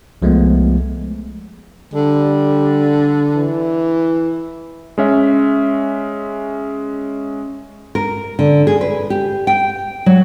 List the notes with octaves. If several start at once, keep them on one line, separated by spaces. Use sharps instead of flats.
C2 F3 G#3 A3 B3
D3 G3
E3
G#3 C#4 E5
A#4
D3
G#4
B4
G4
G5
F#3